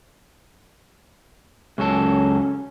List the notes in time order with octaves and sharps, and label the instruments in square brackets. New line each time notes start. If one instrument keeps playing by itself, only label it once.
[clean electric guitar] C#2 F#3 A4 [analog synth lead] C#4